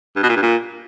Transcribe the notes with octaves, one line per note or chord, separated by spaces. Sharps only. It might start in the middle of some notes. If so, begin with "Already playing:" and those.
G2
B2
A#2
G2
A#2